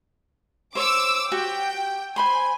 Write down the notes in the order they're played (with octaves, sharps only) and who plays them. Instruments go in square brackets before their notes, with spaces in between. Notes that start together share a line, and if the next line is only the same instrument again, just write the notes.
[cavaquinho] C5 C#5 [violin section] D6 E6
[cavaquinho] F#4 G4 [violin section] G5
[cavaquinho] C5 B5 C6 [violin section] G#5